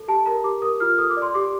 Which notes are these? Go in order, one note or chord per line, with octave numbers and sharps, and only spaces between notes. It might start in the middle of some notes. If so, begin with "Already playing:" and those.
Already playing: A4
G4 A5
A#4 A#5
G4 D6
A#4 D#6
F4 F6
A4 D#6
D6
D5
C6
G4 D6